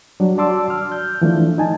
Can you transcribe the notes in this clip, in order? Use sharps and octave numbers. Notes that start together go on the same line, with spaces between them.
F#3 G3 D4
F#4 D5 A5 C6 D6 E6
F6
G6
E3 F3 A3 D4
D#4 G#5 A5